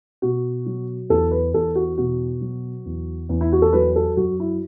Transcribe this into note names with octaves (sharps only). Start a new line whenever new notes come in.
B2 F#4
F#3
E2 A4
B4
E2 A4
F#4
B2 F#4
F#3
E2
E2
E4
F#4
A4
F#3 B4
A4
F#2 F#4
E4